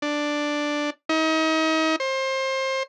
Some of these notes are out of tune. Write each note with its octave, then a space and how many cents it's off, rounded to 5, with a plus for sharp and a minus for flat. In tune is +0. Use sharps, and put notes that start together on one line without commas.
D4 +5
D#4 +35
C5 +25